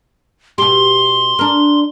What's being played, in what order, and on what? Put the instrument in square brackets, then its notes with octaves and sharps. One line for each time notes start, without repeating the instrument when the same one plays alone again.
[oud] B2 G4 [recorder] C6
[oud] D4 A#4